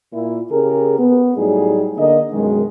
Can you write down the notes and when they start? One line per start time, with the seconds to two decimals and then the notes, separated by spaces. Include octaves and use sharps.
0.13 A#2 E4
0.51 C#3 G4 G#4 A#4
0.98 B3
1.37 A2 F#3 G3 D#4 G#4
1.97 D3 A#3 D#5
2.32 F#2 B2 D#3 G#3